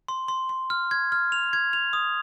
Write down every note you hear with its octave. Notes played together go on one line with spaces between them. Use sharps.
C6
C6
C6
F6
G#6
F6
F7
G#6
F7
D#6